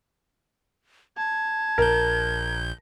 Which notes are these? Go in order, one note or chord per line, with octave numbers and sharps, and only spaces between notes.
A5 G#6
A#1 A#4 G6